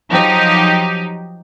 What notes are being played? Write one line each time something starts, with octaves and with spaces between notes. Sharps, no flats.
F3 F#3 D#4 G4